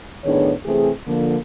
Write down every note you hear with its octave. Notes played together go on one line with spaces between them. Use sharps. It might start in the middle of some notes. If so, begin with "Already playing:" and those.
A2 D#3 B3 D4 G#4 C#5
C3 E3 A3 C4 G#4
D3 F3 A#3